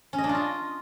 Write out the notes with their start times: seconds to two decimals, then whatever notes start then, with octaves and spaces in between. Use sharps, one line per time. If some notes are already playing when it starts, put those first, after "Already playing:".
0.13 C#4
0.18 D#5
0.24 D4
0.29 F4
0.35 D#5